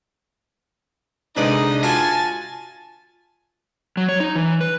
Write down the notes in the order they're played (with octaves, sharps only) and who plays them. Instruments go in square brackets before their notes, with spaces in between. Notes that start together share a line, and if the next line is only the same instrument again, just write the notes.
[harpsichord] C2 B4 D5 [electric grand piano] D3 G#3 D4 [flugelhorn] D#4 [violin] D#5
[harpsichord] F4 F#4 E5 [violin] G#5 A6 [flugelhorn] A5
[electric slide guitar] F#3
C#5
D#4
E3
B4